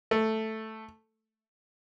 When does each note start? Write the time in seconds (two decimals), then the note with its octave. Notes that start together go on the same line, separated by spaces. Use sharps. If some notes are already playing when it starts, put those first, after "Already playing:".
0.11 A3